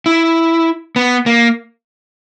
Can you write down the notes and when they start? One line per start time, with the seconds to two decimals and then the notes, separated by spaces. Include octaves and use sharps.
0.06 E4
0.96 B3
1.26 A#3